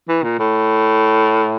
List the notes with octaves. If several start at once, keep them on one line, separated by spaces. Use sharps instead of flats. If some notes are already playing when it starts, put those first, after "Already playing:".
E3
A#2
A2